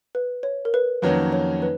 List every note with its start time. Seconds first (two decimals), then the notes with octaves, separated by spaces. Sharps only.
0.15 B4
0.43 C#5
0.65 A#4
0.74 B4
1.02 F2 D#3 F#3 A#3 C#4 B4
1.32 C#5
1.62 B4